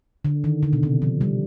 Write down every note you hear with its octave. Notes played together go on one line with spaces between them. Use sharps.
D3
D#3
D3
B2
C3
F3
G3